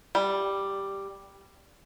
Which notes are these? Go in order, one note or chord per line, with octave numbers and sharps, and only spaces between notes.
G3